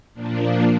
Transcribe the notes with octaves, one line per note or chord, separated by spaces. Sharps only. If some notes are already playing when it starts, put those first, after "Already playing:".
A#2 F3 A#3 D4